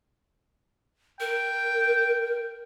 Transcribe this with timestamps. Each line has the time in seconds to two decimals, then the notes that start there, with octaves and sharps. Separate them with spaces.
1.20 A#4 G5